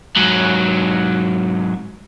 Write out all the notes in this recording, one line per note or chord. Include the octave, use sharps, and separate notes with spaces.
G#2 F#3